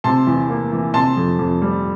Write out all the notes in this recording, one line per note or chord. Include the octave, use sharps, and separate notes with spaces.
C3 A5 C6
E2
A#3
E3
C3 A5 C6
F2
F2
G3